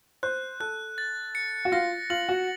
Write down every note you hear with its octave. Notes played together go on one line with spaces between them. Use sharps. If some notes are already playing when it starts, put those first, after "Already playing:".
C5 F#6
A4 F#6
A6
C#7
F#4
F4 A#6
F4 F#7
F#4